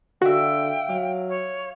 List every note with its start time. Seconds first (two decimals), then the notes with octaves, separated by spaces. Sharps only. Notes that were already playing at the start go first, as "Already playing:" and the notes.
0.22 D3 F#4 E5 F5 G5
0.89 F#3 F5
1.29 C#5